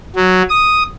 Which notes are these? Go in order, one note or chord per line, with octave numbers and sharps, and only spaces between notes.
F#3
D#6